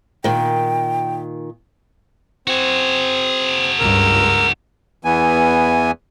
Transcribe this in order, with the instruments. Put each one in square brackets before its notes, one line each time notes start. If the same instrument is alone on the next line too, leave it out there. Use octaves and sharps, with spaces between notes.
[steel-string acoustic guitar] A#2 D#3 [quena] G5
[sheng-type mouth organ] C4 [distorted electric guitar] F#4 G#4
[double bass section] C#2 G2 [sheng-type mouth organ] A#4 E6
[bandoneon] E2 E3 B3 G#5